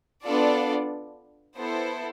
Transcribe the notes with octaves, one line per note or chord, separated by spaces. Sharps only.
B3 D4 F4 A4 D5
B3 E4 A4 C5